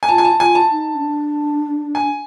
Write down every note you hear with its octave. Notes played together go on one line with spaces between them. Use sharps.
G#5
F4 A5
G#5
A5
F4 G#5
A5
D#4
C#4
D4
G#5